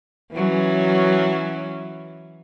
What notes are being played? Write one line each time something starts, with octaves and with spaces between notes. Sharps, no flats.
E3 F#3 C#4